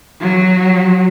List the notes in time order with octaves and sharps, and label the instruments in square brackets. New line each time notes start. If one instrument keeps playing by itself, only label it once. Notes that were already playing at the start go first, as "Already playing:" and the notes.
[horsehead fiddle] F#3